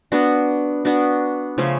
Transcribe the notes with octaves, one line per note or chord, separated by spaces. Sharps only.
B3 D4 F#4
B3 D4 F#4
C#3 F3 A3 C#4